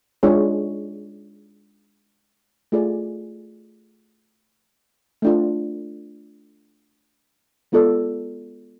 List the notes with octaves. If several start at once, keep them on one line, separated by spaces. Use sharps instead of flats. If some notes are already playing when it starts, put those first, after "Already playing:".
G#3 D4 F4 G#4 C#5
A3 F4 G#4 D5
A3 D4 F4
G#3 B3 F4 A4 D5